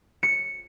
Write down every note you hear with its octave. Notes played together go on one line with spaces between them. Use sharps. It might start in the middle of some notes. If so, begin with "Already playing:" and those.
C#7